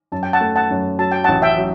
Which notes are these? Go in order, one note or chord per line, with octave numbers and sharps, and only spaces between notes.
F#2 A5
G5
F#5 A5
A3
F#5 A5
F#2
F#3 A5
G5
A1 F#5 A5
E5 G5
F#3